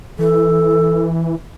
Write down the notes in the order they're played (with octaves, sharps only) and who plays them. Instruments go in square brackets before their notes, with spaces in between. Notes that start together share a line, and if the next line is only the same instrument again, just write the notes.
[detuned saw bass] E3 [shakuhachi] A4